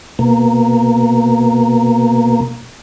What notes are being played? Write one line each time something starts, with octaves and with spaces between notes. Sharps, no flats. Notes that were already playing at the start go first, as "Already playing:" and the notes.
B2 A#3